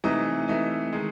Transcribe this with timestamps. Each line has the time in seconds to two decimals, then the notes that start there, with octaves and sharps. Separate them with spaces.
0.04 C3 E3 A3 D#4
0.48 C3 E3 A3 D#4
0.93 D#3 G#3